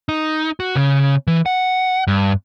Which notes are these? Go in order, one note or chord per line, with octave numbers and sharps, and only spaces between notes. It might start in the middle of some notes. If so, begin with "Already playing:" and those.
D#4
F#4
C#3
E3
F#5
G2